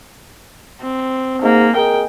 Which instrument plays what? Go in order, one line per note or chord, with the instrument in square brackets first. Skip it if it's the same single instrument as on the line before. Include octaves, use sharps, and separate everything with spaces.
[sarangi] C4
[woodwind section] G#2 [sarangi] A#3
[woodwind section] G#3 G#4 A#4 [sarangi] G5